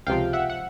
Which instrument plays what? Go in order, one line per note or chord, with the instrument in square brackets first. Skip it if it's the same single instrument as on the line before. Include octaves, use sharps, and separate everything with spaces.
[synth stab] C#2 C3 F3 F5 G5
E5 F#5
F#5